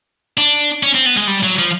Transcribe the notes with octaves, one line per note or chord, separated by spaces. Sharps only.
D4
C#4
C4
B3
G#3
G3
F#3
F3